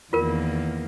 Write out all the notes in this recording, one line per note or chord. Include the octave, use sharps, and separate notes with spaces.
E2 D#3 A#3 F4 A#4